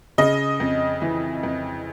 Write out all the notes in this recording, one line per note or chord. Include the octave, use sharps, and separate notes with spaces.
C#3 D#5
F2
E3
F2